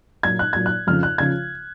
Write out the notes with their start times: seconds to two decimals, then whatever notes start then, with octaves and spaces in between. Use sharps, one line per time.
0.23 A#2 F#3 G#6
0.39 F#6
0.53 A#2 F#3 G#6
0.66 F#6
0.87 F2 C#3 F3 F6
1.03 F#6
1.18 C#3 F3 G#6